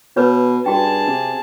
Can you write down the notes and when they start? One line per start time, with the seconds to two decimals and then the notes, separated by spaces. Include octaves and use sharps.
0.17 B2 B4 C#5
0.66 G2 F#4 G#4 G5 A5
1.07 C3